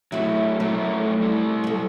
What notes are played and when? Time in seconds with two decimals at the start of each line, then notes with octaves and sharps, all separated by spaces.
0.12 F#3 A3 E4 F#4
0.60 F#3 A3 E4 A#4
1.20 G3 E4
1.64 F#3 A4